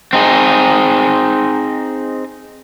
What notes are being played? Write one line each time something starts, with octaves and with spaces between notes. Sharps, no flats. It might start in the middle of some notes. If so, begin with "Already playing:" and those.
C4 D#4 G#4